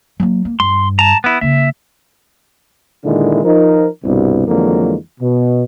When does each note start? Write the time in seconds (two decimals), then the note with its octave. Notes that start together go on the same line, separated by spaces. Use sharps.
0.20 F#3 A#3
0.45 A#3
0.60 G2 C6
0.99 A5 A#5
1.24 B3 E4
1.41 C#3 A#3 E5
3.05 A#2 D3 D#3 G#3 E4
3.44 F3 D#4 A#4
4.04 C2 G2 B2
4.47 F2 D3 E3 F#3 G#3 A#3
5.20 B2